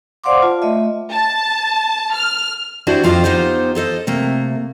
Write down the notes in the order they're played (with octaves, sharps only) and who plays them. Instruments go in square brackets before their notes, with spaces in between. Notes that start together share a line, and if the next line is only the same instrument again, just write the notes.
[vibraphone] C5 D5 F5 F#5 C6 D6
F4 A5
A3 D#5 E5
[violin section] A5
F6
[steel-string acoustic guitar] D4 E4 F#4 G4 C5 C#5
F2 F4 G4 C5 D#5 F5
B3 D#4 F4 G4 C5
F4 A4 C5 D#5
C3 A3 A#3